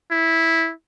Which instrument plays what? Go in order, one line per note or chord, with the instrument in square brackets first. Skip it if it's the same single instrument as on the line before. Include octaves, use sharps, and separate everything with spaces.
[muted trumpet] E4